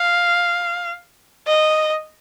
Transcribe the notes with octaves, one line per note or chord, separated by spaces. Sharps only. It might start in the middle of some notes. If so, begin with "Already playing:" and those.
Already playing: F5
D#5